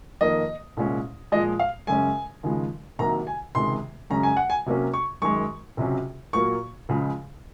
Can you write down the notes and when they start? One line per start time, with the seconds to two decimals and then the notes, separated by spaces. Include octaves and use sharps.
0.21 F2 D#3 A#3 D#5
0.77 C2 A#2 G#3 C#4
1.32 A#2 F3 G#3 D#5
1.60 F5
1.87 F#2 C#3 G#3 C#4 G#5
2.43 D#2 C#3 F3 G#3
2.99 C2 C3 D#3 F#3 A#3 A#5
3.27 G#5
3.55 C#2 C3 D#3 G#3 C6
4.10 F#2 C#3 G#3 C#4 A#5
4.23 G#5
4.37 F#5
4.50 G#5
4.66 C3 F#3 A#3 C#4
4.94 C#6
5.22 F#2 D#3 G#3 C#6
5.77 C#2 C3 F#3 C#4
6.33 A#2 F#3 A#3 C#6
6.89 C#2 C#3 F3 G#3